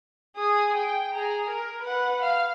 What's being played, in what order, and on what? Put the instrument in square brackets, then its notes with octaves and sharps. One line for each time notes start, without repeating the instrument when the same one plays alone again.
[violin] G#4 D#6
G5
G#4 A#5
A#4
B4 F#5
F5